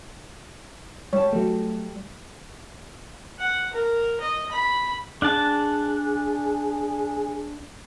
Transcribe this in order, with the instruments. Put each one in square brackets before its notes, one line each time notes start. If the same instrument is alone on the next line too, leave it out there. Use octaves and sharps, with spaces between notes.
[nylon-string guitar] G3 A5 [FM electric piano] C#5
[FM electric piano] F#3 A3
[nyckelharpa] F#5
A#4
D#5
B5
[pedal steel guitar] D4 F#5 A5 [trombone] G#4